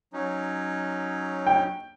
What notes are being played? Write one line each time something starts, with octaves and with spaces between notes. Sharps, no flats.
F#3 C#4 D#4
G5